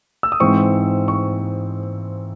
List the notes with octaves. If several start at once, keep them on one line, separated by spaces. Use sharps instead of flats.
E6
D#6
G#2 E3 C4 C#6
C#6